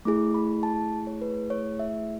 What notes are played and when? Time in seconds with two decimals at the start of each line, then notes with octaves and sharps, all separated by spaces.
0.05 A3 E4 G#4 D6
0.34 B5
0.63 A5
1.07 C#5
1.21 B4
1.50 C#5
1.79 E5